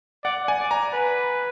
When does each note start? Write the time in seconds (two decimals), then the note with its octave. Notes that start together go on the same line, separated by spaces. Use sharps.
0.24 D5 F#5
0.48 G#5
0.60 D5
0.71 A#5
0.93 B4